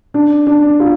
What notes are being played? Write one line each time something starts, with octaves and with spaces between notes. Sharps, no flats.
D4
D4
F4